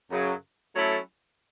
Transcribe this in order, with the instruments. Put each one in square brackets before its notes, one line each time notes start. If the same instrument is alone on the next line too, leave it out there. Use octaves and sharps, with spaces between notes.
[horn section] F#2 C#3 F#3
F#3 A3 C#4 E4 A4